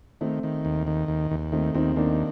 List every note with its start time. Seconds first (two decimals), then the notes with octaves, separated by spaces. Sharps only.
0.21 D#3 A3 C4
0.43 D#3
0.65 D#2
0.87 D#3
1.08 D#2
1.31 D#2
1.52 D#3 A3 C4
1.74 D#2 C4 D#4
1.96 D#3 A#3 D4